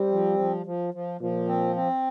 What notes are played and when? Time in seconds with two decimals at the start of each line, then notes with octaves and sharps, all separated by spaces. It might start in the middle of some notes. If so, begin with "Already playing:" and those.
Already playing: G3 C4
0.12 F3
0.39 F3
0.66 F3
0.94 F3
1.21 A#2 F3
1.48 C4
1.76 C4